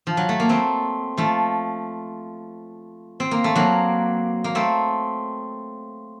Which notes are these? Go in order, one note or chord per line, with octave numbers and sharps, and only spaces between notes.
F3
F#3
A3
A#3
A3 C4
F3 A3
C4
A#3
A3
F#3 A#3
A#3
A3 C4